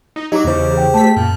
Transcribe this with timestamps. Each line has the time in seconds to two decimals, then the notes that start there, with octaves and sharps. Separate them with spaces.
0.16 D#4
0.32 F#3 D#4 G4 D#5 A#5 D6
0.44 E2 C#3 G4 C5
0.73 G#4 G5
0.94 A3 A5 B6
1.17 F#2 A#2